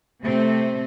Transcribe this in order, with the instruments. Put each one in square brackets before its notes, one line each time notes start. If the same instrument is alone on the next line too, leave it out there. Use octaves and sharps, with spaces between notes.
[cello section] C3 A3 C4